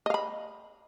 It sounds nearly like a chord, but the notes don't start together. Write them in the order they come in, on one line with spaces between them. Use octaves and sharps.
D#5 F5 B5